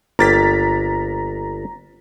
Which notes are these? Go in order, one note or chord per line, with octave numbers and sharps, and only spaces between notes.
G1 A#3 G5 A#5 A6 B6